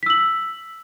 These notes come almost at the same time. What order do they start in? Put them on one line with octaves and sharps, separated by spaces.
B6 E6 F#7